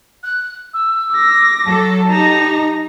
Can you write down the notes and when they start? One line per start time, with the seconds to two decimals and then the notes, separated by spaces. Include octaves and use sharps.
0.23 F#6
0.73 E6
1.12 D6 A#6
1.65 F#3 A4 A5
2.10 D#4 G4 A#5